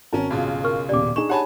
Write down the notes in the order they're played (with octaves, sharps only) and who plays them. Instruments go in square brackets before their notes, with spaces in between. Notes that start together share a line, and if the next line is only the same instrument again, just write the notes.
[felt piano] G#1 F#4 A5 [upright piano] C#4 A#4
[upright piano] B1 C#3 F4
[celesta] A#4 C#6 F6
[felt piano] D#1 B2 G4 [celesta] D5 D6
[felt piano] D4 D#4 G#4 [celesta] C#6 [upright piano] E7
[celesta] G4 C#5 B5 [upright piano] F#5 G#5 A5